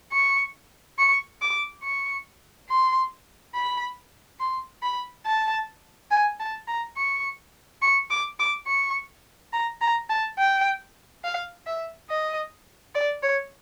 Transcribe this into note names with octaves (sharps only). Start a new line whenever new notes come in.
C#6
C#6
D6
C#6
C6
B5
C6
B5
A5
G#5
A5
A#5
C#6
C#6
D6
D6
C#6
A#5
A#5
A5
G5
F5
E5
D#5
D5
C#5